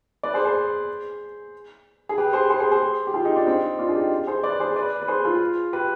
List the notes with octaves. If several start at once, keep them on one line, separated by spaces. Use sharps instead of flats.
B4 D5
G#4 C5
G#4 C5
G#4
G4 B4
G#4 C5
G#4 C5
G#4 C5
G#4 C5
G4
F4 G#4
D#4 G4
D4 F4
C4 D#4
D4 F4
G#4
D#4 G4
G#4 C5
B4 D5
G#4 C5
B4 D5
B4
G#4 C5
F4 G#4
G4 B4